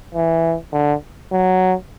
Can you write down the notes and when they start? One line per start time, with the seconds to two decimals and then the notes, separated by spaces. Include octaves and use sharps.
0.14 E3
0.73 D3
1.32 F#3